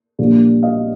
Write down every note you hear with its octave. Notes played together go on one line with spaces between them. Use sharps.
A#1 A#2 G3 A#3
D#5 F5